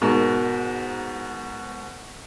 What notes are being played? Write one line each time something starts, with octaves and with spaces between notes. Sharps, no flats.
G#2 B2 A#4